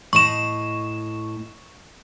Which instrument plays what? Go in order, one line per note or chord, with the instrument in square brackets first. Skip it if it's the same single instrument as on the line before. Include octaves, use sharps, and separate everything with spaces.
[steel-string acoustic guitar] A2 D#5 [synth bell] C#6 E7